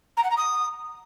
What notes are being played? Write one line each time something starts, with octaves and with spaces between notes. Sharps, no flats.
A#5
F#5
A#5
D#6